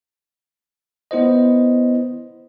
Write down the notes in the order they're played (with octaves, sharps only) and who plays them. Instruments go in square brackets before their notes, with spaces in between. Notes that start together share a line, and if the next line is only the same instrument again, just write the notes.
[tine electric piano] B3 E4 C5 D#5